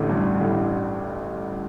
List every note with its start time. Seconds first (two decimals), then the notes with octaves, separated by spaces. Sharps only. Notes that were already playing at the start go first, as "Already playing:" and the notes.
Already playing: A1 D2 A2 D3
0.09 G2
0.40 A1 A2